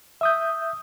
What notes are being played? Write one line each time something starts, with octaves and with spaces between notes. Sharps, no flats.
E5 D#6 G6